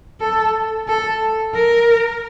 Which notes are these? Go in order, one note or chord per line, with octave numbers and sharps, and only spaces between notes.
A4
A4
A#4